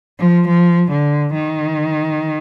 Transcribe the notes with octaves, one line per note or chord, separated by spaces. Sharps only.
F3
F3
D3
D#3